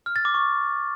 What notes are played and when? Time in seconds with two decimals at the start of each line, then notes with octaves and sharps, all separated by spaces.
0.06 F6
0.16 A6
0.25 D6
0.34 C#6